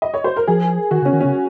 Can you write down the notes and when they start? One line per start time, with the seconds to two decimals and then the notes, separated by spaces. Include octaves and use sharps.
0.02 D#5
0.14 C#5
0.24 C5
0.36 A#4
0.47 F3 G#4
0.91 D#3 F#4
1.02 C#3
1.05 C#4
1.13 D#3
1.20 C#3 C#4